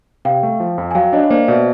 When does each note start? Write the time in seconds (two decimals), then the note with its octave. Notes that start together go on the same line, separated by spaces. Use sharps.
0.25 C3 F5 G5
0.43 A3
0.60 F3
0.78 F2
0.91 G#5
0.95 F#3 F5 G5
1.13 D4 C#5 D#5
1.24 C#5
1.30 A#3 C5 D5
1.48 B2 D5 E5